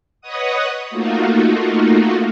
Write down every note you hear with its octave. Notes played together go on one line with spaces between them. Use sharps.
B4 C#5 D#5 F#5 D#6
A3 A#3 D#4 F4 F#4